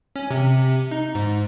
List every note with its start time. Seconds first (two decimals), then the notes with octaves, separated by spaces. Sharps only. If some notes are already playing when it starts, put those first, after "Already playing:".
0.16 C#4
0.31 C3
0.91 D#4
1.15 G#2